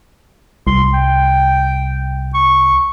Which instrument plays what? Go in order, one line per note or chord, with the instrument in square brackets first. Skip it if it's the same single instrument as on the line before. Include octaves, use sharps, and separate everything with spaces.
[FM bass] C2 [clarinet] C6
[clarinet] G5
C#6